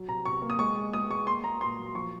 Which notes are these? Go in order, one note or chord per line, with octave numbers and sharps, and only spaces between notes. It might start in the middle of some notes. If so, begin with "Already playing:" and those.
Already playing: F#3
C3 A#5
C3 C#6
A#3
D#6
G#3 C#6
G#3
G#3 D#6
G#3 C#6
A#3 C6
A#3 A#5
A#2 C6
F#3
F3 C#6